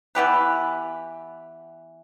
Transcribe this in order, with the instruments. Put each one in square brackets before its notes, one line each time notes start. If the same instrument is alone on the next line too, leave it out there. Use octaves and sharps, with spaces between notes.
[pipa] E3 B3 G4 B4